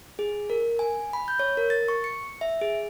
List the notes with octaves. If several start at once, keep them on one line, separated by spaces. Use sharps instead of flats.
G#4
A#4
G#5
B5
G6
C#5
A#4
A6
C#6
C#7
E5
G#4